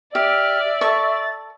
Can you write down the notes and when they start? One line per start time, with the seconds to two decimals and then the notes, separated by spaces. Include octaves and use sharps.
0.15 G4 D5 E5 F6
0.81 A4 C#6 A6